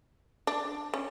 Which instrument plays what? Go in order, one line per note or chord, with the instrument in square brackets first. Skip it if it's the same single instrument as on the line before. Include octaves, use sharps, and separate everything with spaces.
[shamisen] D4
C#4